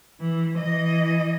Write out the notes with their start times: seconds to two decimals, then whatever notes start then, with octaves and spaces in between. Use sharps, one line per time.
0.20 E3
0.58 E3 D#5